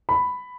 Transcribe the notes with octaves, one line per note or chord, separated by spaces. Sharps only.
B5